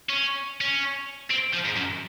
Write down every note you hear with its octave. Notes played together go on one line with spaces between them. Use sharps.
C#4
C#4
C4
F3
G#2
F#2